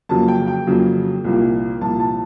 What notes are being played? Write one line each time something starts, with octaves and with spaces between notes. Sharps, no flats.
F2 C#3 F#3 A#3 A5
G5
G5
F2 C#3 F#3 A#3
C2 A#2 F3 A#3
C2 A#2 F3 A#3 A5
A5